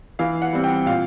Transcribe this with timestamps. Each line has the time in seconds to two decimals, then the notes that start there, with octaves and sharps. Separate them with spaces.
0.19 E3 F5
0.42 F#5
0.52 G3 C4
0.64 G5
0.86 A#2 F5